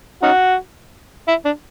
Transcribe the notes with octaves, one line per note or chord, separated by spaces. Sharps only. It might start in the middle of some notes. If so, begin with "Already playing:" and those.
C#4 D#4 F#4
E4
D4